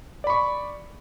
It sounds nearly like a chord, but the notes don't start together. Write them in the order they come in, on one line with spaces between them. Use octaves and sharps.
D5 B5 C#6